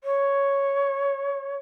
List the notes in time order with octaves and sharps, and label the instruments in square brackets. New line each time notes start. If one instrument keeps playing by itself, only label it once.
[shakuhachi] C#5